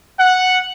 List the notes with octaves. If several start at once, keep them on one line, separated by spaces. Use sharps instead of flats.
F#5